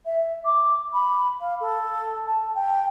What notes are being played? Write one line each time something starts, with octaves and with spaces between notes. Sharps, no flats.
E5
D6
B5
F5
A4
A5
G5